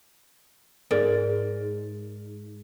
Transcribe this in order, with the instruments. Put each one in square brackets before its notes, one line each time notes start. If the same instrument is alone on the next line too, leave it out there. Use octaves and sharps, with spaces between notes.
[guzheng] G#2 [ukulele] A#4 D5